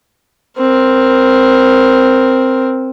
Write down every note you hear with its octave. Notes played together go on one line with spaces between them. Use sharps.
C4 A#4